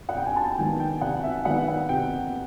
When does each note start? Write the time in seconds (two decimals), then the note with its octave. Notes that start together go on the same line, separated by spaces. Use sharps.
0.09 F#5
0.14 C3 G5
0.26 G#5
0.36 A5
0.52 G5
0.58 D#3 G#3 B3 G#5
0.80 G5
1.01 C3 F#5
1.23 E5
1.45 D#3 G#3 B3 F#5
1.68 F#5
1.89 C3 G5